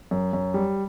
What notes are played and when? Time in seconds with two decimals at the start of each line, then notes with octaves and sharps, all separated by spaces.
0.11 F#2
0.33 F#2
0.54 G3